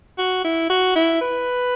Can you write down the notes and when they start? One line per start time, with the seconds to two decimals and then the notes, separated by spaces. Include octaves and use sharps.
0.18 F#4
0.44 E4
0.70 F#4
0.96 E4
1.21 B4